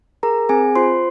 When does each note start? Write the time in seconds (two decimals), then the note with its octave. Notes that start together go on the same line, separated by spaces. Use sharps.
0.23 G#4 A#4 A#5
0.49 C4 G#4 G#5
0.76 F4 C5 C6